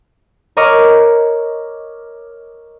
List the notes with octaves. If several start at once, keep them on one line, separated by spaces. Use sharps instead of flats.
A#4 C#5 D#5 C#6 D6 F6